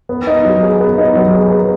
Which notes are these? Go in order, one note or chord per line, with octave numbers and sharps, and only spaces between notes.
B3
D#4
F#3
G#4
B3
D#4
F#3
G#4
B3